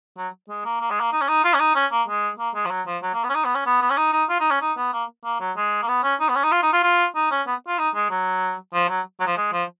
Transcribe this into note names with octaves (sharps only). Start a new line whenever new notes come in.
F#3
G#3
A#3
A#3
G#3
A#3
D#4
C#4
D#4
F4
C#4
D#4
C#4
A#3
G#3
A#3
G#3
F3
F#3
F3
F#3
A#3
B3
C#4
D#4
B3
C#4
B3
B3
C#4
D#4
D#4
F4
D#4
C#4
D#4
B3
A#3
A#3
F#3
G#3
A#3
B3
C#4
D#4
B3
C#4
D#4
F4
D#4
F4
F4
D#4
C#4
B3
F4
D#4
G#3
F#3
F3
F#3
F#3
F3
G#3
F3